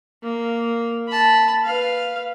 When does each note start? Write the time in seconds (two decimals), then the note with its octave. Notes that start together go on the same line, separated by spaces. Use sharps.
0.23 A#3
1.08 A5 B5
1.64 B4 F5